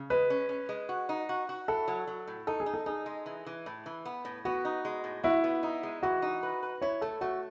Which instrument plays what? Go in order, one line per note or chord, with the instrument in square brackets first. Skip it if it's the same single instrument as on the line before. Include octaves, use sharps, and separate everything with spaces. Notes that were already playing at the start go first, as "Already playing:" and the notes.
Already playing: [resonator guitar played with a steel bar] C#3
[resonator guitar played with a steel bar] G#3 [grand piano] B4
[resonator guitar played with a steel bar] C#4
C#4
G#3
F#4
D#4
F#4
F#4
[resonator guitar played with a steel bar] E4 [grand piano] A4
[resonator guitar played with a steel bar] F#3
F#3
A2
[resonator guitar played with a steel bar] D#4 [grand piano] A4
[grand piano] G#4
[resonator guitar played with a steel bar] D#4
[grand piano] A4
[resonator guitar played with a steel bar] D#4 [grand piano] G#4
[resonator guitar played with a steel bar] G#3
E3
E3
A2
E3
B3
A2
[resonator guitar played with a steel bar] B3 [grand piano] F#4
[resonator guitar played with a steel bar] D#4
G#3
A2
[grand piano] E4 [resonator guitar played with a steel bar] F#4
[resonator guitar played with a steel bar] B3
D#4
G#3
[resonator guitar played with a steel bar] E3 [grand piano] F#4
[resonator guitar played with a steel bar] D#4
B4
B4
[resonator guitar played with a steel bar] E4 [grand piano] C#5
[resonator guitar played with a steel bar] A3 [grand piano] A4
[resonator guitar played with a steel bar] A3 [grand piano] F#4